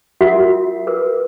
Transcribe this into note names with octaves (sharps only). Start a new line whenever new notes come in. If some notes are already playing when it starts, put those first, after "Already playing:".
F4 F#4 A#4 E5 F#5
A#4 B4